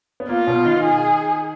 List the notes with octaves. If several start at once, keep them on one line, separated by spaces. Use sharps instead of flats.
B3
A#3 F4
B2 B3
D#3 D#4
G#4